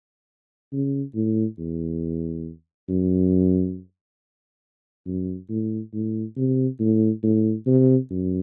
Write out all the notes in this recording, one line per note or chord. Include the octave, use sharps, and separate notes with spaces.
C#3
A2
E2
F#2
F#2
A2
A2
C3
A2
A2
C3
F#2